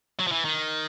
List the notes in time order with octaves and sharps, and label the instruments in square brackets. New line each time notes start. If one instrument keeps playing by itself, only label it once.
[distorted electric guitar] F#3
F3
E3
D#3